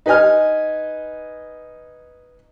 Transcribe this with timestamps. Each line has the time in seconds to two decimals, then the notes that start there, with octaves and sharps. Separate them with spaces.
0.06 D#4 B4 D#5 G#5 F6